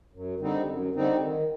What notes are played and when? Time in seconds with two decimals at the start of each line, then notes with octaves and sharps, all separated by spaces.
0.13 F#2
0.40 D3 G3 C4 D#4
0.68 F#2
0.95 D3 G3 C4 D#4
1.22 D#3